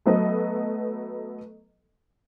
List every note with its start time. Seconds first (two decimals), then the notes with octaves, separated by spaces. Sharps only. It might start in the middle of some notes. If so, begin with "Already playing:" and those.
0.06 F#3 A3 B3 A4 B4 D#5